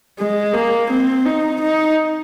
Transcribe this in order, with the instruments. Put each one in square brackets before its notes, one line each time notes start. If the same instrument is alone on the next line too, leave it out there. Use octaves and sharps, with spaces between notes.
[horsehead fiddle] G#3
A#3
C4
D#4
D#4